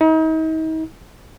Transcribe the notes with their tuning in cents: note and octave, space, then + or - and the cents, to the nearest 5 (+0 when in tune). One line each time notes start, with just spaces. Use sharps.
D#4 +40